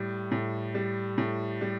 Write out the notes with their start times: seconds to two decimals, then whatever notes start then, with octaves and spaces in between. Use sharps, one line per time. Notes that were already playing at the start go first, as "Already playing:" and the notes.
Already playing: A2 G3
0.31 A2
0.74 G3
1.18 A2
1.61 G3